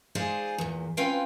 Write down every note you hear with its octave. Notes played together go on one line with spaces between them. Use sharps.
G#3 D#4 F4 G#4 C5 D5
E2 A#2
C4 C#4 F4 B4 F5 G5